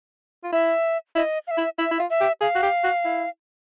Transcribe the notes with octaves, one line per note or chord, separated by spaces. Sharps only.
F4
E4 E5
E4 D#5
F5
E5
E4
E4 E5
E4
F4
E5
G4
G#4 F5
F#4
G4
F#4
E4